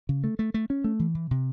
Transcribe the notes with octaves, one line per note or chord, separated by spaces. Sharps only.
C#3
A3
A3
A3
C#4
A3
E3
E3
C3